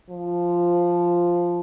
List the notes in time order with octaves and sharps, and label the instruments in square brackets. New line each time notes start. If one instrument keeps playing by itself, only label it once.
[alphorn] F3